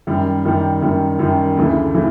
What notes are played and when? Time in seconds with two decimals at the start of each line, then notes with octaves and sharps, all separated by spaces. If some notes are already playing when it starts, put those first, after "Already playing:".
0.07 F#2 D#3 G3
0.45 F#2 D#3 G3
0.82 F#2 D#3 G3
1.19 F#2 D#3 G3
1.57 D2 C#3 E3 A3
1.94 C#3 E3 A3